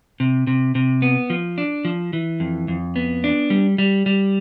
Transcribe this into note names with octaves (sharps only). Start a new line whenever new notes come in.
C3
C3
C3
B3
F3
D4
F3
E3
F2
F2
B3
D4
G3
G3
G3